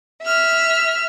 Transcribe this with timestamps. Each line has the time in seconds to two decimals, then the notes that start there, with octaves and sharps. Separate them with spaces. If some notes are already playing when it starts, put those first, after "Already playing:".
0.22 E5 F6